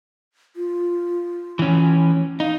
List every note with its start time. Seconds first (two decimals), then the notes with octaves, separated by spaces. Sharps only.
0.56 F4
1.59 E3 C#4
2.40 D#4 F5